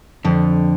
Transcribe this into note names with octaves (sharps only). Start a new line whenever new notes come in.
F2 D3